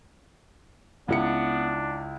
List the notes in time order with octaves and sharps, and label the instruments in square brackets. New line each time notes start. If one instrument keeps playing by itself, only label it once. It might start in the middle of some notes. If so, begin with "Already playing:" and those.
[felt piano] C#2 E4 C#7 [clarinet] B3 [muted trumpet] D4